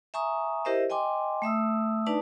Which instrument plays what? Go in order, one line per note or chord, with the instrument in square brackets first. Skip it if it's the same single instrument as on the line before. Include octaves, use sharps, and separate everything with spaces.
[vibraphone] E5 G#5 A#5 C#6 D#6
E4 G4 A#4 C5 D#5 E5
D#5 G5 G#5 C6 D6
A3 E5 D#6 E6
D4 D#4 B4 D5 A5 D6